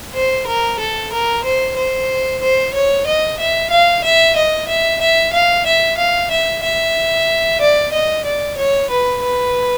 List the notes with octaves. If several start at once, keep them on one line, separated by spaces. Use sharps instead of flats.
C5
A#4
A4
A#4
C5
C5
C5
C#5
D#5
E5
F5
E5
D#5
E5
E5
F5
E5
F5
E5
E5
D5
D#5
D5
C#5
B4
B4